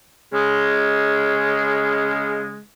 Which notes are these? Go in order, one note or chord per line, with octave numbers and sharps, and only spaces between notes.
C#3 G#3